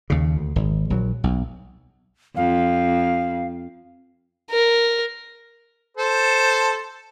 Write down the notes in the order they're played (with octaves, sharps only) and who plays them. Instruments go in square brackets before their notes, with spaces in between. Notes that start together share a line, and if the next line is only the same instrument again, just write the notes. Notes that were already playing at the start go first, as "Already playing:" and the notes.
[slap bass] D#2 C#3
D2
G#1
A#1 F#3
B1
[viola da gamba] F2 [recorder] F5
[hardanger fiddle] A#4
[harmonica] A4 C5